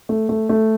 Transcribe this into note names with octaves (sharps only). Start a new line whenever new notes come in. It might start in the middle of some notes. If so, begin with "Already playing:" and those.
A3
A3
A3